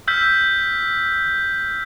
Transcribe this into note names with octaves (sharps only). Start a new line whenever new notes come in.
E6 F6 G6 B6